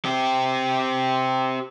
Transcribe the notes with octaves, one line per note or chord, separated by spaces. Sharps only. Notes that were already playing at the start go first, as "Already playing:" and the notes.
C4 G4